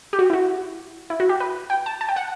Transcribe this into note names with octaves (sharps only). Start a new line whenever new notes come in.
G4
F#4
E4
F#4
E4
F#4
G4
B4
G5
A5
A5
G5
F#5